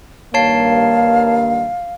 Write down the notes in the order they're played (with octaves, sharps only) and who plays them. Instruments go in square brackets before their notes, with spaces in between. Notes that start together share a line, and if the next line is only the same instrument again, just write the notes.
[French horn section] G2 D#3 A#3 [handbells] C#5 A5 C7 [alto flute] F5